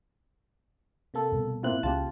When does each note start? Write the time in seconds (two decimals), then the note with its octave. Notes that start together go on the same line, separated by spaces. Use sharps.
1.14 C3 A#3 A4
1.32 G2 B2
1.63 A#2 A#3 C4 E4 F4 F#6
1.83 C#2 C#3 A#3 F4 G4 A5